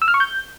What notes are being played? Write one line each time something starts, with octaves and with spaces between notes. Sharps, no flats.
E6
F6
C#6
G6